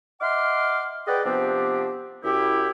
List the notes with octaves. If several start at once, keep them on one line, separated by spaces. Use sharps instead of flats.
D#5 E5 F#5 C6 D6 F6
G#4 B4 D5 D#5 F#5 G5
C3 F3 B3 C4 D4 G4
F#2 E4 G4